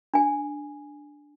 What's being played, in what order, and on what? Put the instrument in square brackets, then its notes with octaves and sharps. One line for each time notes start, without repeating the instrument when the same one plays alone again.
[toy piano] D4 G#5